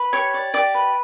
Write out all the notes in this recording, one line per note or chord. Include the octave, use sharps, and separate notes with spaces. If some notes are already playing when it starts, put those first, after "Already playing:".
Already playing: B4
G4 C#5 C#6
D5
G4 D5 D6
B4